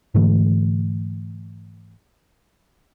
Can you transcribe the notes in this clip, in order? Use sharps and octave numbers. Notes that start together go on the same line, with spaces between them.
G#2 D3 E3 A3